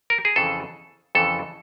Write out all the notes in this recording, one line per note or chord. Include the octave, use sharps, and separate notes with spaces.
A#4
G#4
F2 C#3 E3 A4
F2 C#3 E3 A4